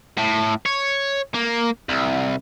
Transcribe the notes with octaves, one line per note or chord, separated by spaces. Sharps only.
A2
C#5
A#3
C2